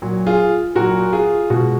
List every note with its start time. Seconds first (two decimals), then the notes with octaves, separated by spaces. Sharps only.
0.02 A#2 F#3
0.26 F4 G#4
0.75 A#2 F#3 F#4 A#4
1.13 F4 G#4
1.50 B2 G#3 F#4